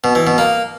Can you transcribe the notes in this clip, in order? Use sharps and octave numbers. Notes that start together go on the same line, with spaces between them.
B2
E3
B2
A#3